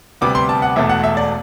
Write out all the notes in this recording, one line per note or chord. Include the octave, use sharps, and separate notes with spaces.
D2 C3 G3 B3 D6
C6
A5
F#5
E1 E2 B2 A3 E5
F#5
E5
D5